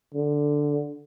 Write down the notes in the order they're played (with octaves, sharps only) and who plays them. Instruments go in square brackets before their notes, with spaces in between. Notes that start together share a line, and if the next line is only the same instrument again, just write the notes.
[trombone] D3